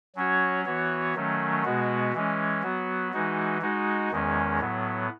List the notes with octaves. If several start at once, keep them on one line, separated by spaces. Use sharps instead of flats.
F#3 C#4 F#4 C#5
E3 B3 F#4 C#5
D#3 F#3 A3 C#4
B2 G#3 B3 F#4
E3 G#3 C#4
F#3 B3 F#4
E3 G#3 D#4 F#4
G#3 D#4 F#4
E2 D#3 G#3 C#4
A2 F#3 B3